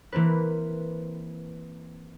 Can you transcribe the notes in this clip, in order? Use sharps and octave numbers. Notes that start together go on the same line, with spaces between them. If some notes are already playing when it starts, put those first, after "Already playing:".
E3 A#3 C4 B4